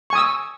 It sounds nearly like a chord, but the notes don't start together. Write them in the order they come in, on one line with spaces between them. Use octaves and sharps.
C#6 G#5 D#6 E6